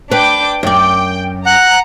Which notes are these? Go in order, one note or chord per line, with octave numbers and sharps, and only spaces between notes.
D4 B4 G5 D6
F#2 D5 G5
F#5 A#5 F#6